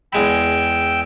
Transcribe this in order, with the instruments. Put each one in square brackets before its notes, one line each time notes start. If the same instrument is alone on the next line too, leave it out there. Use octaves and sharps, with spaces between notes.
[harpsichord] E2 G#3 B5 [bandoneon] G5 E6